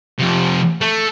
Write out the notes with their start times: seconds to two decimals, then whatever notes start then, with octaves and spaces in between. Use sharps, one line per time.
0.19 F2 C3
0.81 A3